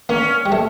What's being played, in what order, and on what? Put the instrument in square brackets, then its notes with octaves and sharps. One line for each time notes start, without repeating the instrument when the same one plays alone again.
[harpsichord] A#3 [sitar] C#4
[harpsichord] G3
A3